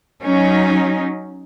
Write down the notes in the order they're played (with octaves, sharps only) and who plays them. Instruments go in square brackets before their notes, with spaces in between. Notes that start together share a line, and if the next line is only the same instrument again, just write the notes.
[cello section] F#3 C#4 D#4